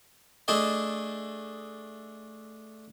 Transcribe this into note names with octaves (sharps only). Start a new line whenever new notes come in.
A3 D4 G#4 D#5